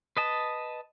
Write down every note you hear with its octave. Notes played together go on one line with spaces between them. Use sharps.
B4 D#5 A5